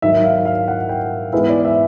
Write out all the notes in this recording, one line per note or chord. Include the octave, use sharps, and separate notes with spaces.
G#2 D#3 F#3 E5
F5
F5
F#5
G5
G#2 E3 G#3 B3 E5
D5
E5